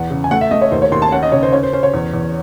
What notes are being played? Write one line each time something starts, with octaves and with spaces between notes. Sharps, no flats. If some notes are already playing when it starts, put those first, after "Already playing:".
Already playing: E2 F#5
C#3
G#5
A3 F#5
E5
A3 D#5
C#5
D#2 C5
C#5
D#2 C6
A5
C#4 F#5
D#5
C#3 C#5
C5
C#4 C#5
C5
C#4 C5
C#5
E2
E2